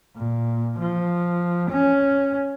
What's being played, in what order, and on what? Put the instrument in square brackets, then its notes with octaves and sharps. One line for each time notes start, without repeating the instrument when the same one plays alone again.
[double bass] A#2
F3
C#4